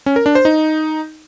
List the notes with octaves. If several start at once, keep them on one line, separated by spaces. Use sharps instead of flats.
C#4
A#4
D4
C5
D#4